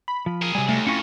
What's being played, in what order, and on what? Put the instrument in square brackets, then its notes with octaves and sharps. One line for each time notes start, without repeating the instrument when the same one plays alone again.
[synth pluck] B5
[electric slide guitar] F3
[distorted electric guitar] G#4 A#4
[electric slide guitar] C3 F#3 G3 [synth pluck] G#5
[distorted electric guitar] D#2 [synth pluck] A3
[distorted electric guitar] F2 [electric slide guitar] C#4 E4 G#5 [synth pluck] C#6 C#7